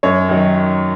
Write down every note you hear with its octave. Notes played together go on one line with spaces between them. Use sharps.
F#2 C#5
D#3 F#3